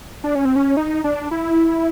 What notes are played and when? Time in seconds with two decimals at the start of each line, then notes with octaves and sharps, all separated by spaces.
0.24 D4
0.35 C#4
0.45 C4
0.56 C#4
0.77 D#4
1.04 D4
1.31 E4